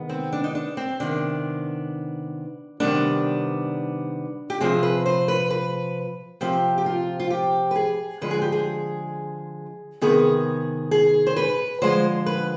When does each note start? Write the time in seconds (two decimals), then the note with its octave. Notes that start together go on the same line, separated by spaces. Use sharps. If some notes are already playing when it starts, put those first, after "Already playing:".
Already playing: C3 D#3 G#3 B3
0.09 C4
0.33 D4
0.44 D#4
0.55 D4
0.77 C4
1.00 C3 D#3 B3 D4
2.80 C3 D#3 G3 B3 D4
4.50 G4
4.61 C3 F3 C4 G#4
4.83 B4
5.06 C5
5.28 B4
5.50 B4
6.41 C3 F3 C4 G4
6.78 G4
6.86 F4
7.20 F4
7.30 G4
7.71 B4
7.76 G#4
8.21 D3 F3 G#3 B4
8.31 G#4
8.42 G4
8.52 G#4
10.01 C3 D#3 B3 G#4
10.91 G#4
11.27 C5
11.36 B4
11.82 D3 F3 G#3 C5
12.26 B4